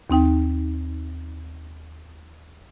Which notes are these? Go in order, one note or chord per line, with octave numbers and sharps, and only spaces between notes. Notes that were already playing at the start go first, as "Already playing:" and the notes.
D#2 C4 D#4 G5